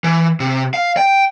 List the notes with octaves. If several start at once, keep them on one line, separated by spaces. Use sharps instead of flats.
E3
C3
F5
G5